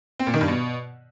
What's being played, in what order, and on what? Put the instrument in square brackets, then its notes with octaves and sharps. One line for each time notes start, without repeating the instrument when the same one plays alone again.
[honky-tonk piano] C4
A#2
D#3
G2
B2